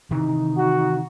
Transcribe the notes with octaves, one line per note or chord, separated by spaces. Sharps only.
C3 D#3 E3 D#4
F#4